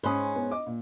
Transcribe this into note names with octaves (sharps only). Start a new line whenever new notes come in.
G#2 C#4 B5 C6 D#6
B3
D#5 D6
A#2